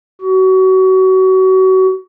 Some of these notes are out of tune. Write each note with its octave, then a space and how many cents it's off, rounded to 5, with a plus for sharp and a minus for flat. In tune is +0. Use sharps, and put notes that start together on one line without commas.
F#4 +30